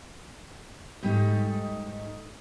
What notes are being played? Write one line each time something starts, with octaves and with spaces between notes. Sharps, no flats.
G#2 G3 A3 C4 D#4